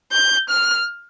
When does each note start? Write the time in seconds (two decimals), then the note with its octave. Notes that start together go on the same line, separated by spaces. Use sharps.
0.12 G6
0.49 F6